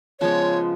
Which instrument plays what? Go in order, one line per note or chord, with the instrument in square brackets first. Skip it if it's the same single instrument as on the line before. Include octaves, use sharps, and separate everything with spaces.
[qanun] C#3 F3 G#3 B3 [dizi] C#5